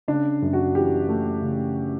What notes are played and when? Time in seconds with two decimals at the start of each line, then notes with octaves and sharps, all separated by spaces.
0.08 C#3 D4
0.42 F#2
0.53 F#4
0.75 E3 G4
1.08 A3
1.42 C#3